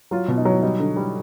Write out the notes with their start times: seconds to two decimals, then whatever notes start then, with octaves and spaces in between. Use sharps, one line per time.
0.11 F#3 F4
0.28 B2
0.38 D#4
0.45 F#3
0.63 G3 D#4
0.80 D3
0.96 G3